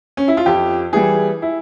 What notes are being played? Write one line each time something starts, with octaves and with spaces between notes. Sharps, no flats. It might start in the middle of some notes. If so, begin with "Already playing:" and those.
C#4
E4
F4
F2 G4
E3 G3 G#4
E4